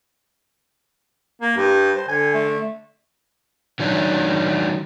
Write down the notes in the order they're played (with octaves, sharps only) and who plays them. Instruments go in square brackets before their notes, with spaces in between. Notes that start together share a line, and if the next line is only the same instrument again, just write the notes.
[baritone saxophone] A#3
[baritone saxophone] G2 [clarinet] G4
[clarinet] C5
[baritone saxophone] D3 [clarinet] G#5
[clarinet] A3
[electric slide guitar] D#3 F#3 D4